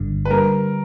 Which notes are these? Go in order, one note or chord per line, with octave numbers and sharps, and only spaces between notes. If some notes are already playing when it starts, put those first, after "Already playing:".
Already playing: G1 G2 D3
B4
D3 G3 A#3 A#4